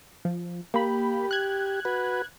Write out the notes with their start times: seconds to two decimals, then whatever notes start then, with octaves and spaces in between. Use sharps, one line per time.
0.25 F3
0.74 A#3 G4 B5
1.31 F#6 G#6
1.85 F#4 B4